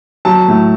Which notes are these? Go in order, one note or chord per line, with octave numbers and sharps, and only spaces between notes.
F#3 A5
A2